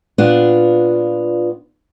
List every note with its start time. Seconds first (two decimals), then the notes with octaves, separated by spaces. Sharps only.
0.18 A#2 B3 D4 F4